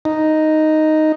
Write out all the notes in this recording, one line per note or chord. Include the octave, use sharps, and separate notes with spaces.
D#4